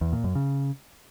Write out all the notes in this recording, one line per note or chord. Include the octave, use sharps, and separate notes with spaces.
E2
A#2
F#2
C#3